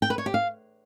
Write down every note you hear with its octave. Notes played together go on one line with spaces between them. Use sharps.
G5
B4
C#5
G4
F5